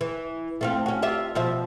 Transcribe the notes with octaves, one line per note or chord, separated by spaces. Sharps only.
E3
A3 C4 F4
C#4 F#4
F4 G4 E5
B2 F3 E5